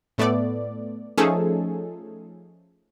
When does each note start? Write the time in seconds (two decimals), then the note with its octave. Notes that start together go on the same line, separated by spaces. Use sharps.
0.18 A2 A3 B3 D5
1.18 F3 A3 C#4 D#4 G#4 A4